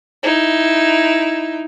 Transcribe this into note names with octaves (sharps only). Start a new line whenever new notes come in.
D#4 E4